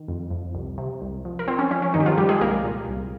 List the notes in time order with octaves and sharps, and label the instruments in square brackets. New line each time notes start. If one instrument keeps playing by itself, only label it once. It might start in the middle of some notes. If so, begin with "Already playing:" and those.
Already playing: [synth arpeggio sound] D#3
F2
F2
C2
C3
C2
F3
A#4
F3 C4 C5
C#4
F3 C#4
C#4
G2 D#3 D#4
G4
F3 F4
G2 G3 G4
G#3 G#4
C2 A#3 A#4
A#2
C2